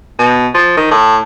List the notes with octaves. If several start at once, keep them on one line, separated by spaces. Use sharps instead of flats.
B2
F3
D#3
A2